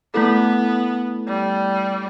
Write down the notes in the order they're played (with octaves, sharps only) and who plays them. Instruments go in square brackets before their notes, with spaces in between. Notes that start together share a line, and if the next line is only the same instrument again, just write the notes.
[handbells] A3 E4 A4 [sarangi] B3
[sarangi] G3